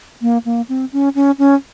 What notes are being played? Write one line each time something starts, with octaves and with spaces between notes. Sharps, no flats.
A#3
A#3
C4
C#4
C#4
C#4